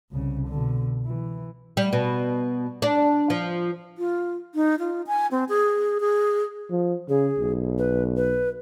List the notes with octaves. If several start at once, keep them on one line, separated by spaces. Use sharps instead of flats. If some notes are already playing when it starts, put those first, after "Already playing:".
C2 C#3
B2 D3
E3
G3
B2
D4
F3
F4
D#4
F4
G#5
C4
G#4
G#4
F3
C#3 G#4
B1
B4
B4